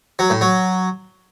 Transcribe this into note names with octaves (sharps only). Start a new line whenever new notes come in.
F#3
A2
F#3